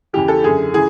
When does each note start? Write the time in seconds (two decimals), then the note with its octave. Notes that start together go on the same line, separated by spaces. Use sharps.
0.13 E2 C#3 E3 G4
0.28 A4
0.44 F#2 D3 G#4
0.74 C#3 E3 G#4